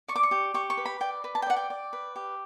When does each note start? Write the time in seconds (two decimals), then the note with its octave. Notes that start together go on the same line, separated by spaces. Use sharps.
0.08 D5 C#6
0.16 D6
0.23 C#6
0.31 G4
0.54 G4 C#6
0.70 C#6
0.77 B4
0.85 B5
1.01 D5 G5
1.24 B4
1.35 A5
1.42 G5
1.47 D5 F#5
1.56 G5
1.70 D5
1.93 B4
2.16 G4